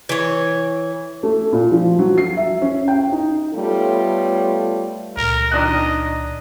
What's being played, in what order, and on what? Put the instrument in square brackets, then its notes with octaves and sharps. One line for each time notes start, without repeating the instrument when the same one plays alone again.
[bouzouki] E3 C#5
[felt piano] A3
A#2
F3
F#3
C7
E5
C#4
G5
D#4
[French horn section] G3 A3 B3 F4 A4 C#5
[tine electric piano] C#2 A#2 [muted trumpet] A#4
[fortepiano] D#3 D4 F#6 [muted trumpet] D#5